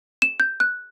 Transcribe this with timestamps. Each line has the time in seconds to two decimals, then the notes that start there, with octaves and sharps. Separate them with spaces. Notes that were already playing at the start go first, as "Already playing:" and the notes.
0.22 E7
0.40 G6
0.60 F#6